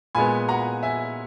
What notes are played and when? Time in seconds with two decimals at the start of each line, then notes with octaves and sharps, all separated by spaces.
0.15 A#2 G#3 B3 G#5 B5
0.49 F#5 A#5
0.83 E5 G#5